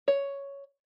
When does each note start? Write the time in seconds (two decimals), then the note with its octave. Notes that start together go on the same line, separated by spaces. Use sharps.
0.08 C#5